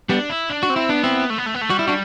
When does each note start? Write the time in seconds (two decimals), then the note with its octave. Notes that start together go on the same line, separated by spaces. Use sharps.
0.09 G3 B3 D4
0.30 E4
0.50 D4
0.63 F#4
0.70 C4
0.76 E4
0.89 B3 D4
1.03 C4 E4
1.30 A3
1.38 B3
1.47 A3
1.55 B3
1.62 A3
1.70 G3 F#4
1.79 E4
1.88 D4 F#4